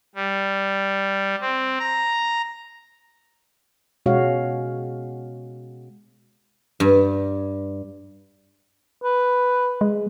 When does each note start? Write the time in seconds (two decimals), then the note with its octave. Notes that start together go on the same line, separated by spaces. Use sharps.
0.15 G3
1.41 C4
1.80 A#5
4.06 B2 G#3 C#4 F#4 C#5 F5
6.80 G2
9.03 B4
9.81 G#3